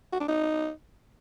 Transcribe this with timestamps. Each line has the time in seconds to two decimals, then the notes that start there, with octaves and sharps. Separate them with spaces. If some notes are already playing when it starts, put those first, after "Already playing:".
0.12 F#4
0.20 D4
0.28 D#4